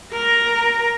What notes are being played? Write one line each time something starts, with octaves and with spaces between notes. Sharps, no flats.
A#4 A#5